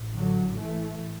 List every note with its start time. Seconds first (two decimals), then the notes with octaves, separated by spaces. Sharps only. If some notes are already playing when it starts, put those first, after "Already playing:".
Already playing: A1 A2
0.15 D3 F#3
0.59 E3 A3